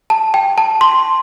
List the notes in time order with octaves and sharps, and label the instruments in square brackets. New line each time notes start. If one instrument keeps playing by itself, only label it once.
[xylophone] A5
G5
A5
C6